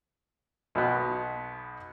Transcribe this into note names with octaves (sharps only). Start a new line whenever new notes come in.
B1 B2 B3